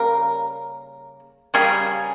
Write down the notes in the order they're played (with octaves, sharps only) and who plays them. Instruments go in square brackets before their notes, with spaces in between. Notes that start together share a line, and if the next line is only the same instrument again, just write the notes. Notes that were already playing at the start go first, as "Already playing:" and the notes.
Already playing: [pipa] C#3 G3 A#3 A#4
C#3 G3 A#3 G#4